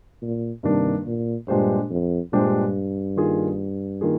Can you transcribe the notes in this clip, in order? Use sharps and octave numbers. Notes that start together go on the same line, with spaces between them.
A#2
G2 C3 D#3 A#3 D4
A#2
G2 A#2 G#3 D4 G4 C5
F2
G2 A#2 G#3 D4 G4 C5
D#3 A#3 F4 G#4
D#3 A#3 F4 G#4